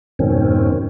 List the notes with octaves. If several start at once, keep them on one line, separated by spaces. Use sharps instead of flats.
F2 G#2 B2 D#3 C4 C#4